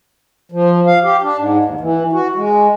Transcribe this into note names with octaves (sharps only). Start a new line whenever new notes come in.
F3
F5
G4
D4
G#2
D#2
E3
F#4
G#3